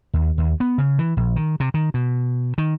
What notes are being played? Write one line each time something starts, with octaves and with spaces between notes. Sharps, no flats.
D#2
D#2
B3
C#3
E3
A#1
D#3
C3
D#3
B2
D#3